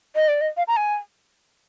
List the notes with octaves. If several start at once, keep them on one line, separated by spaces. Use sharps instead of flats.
D#5
D5
D#5
F5
A#5
G#5